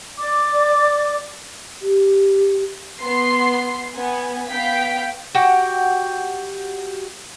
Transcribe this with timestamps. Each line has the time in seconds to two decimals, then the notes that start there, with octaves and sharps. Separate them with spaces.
0.18 D5 D6
1.82 G4
3.02 B3 C6 C7
3.94 B3 G#5
4.49 B3 F5 G5 G6 B6
5.35 F#4 G4 F#5 G5